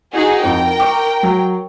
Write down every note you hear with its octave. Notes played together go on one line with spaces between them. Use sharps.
D#4 F#4 G#4
F2 A#4 G5
C#6 D6
F#3